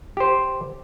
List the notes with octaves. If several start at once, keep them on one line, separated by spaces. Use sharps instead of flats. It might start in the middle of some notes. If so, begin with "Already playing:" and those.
G4 C5